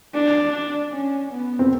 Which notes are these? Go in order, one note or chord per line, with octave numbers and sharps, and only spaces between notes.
D4
C#4
B3
C4